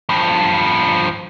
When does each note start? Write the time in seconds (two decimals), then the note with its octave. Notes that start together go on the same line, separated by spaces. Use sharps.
0.09 G2 F3